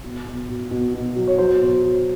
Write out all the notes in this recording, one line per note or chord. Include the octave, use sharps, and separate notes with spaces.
B2
B2
B2
B2
B2
F#3
C#5
F#3 C5
B2
F#3